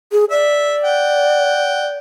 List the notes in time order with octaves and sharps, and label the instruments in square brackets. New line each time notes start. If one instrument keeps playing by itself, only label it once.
[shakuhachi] G#4
[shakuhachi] D5 [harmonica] E5
[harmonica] F#5 G5